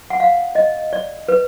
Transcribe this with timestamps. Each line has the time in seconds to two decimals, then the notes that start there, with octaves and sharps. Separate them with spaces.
0.10 F#5
0.20 F5
0.55 D#5
0.93 D5
1.29 B4